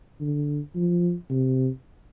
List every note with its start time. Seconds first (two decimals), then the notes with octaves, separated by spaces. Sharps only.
0.21 D3
0.76 F3
1.30 C3